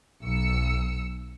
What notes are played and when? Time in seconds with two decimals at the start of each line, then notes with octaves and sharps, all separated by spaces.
0.23 B1 E6 C#7